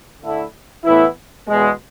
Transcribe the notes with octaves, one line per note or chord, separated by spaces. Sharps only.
D3 A3 E4
A2 E3 B3 E4
E2 B2 G#3